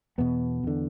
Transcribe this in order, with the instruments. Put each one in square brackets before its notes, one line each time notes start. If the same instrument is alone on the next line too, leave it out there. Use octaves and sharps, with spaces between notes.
[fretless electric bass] E2 B2 B3
E2 D3